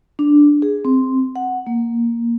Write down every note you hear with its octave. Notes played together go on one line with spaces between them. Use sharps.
D4
G#4
C4
F#5
A#3